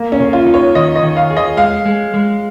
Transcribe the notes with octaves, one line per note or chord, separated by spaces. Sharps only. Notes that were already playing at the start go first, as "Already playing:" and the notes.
Already playing: A#3
C#4
C#3
F4
D#4
C#5
D#3 D#5
D#5
D#3
F5
G#4
D#5
G#3 F5
G#3
G#3